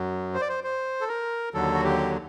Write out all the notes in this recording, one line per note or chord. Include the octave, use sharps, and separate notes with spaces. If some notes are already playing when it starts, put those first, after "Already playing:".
Already playing: F#2 F#3
C5
D5
C5
C5
A4
A#4
D#2 D3 F#3 A4
F#4
G4